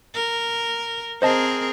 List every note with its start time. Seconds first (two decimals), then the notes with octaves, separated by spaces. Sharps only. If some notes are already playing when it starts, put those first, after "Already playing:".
0.15 A#4
1.22 C4 G#4 A#4 C5 D#5 A5